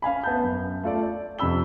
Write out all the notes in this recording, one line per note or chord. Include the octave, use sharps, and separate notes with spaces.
C#4 F5 G#5 B5
B3 A5 G6
F#2
A3 F4 A4 D5
D5
F2 C3 C#4 B5 E6 G7